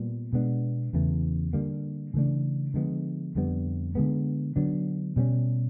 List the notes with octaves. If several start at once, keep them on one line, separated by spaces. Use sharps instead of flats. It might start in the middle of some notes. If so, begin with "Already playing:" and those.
Already playing: A#2 G3 B3
B2 G#3 B3 D4
E2 C#3 E3 A3
D3 G3 A#3
C#3 E3 A3 D4
D3 F3 G#3 B3
F2 D3 G3 B3
D3 F3 G#3 B3
D3 F#3 B3 D4
B2 G3 A#3 C#4